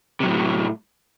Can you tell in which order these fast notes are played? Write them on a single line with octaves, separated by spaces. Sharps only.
C3 F#3 A2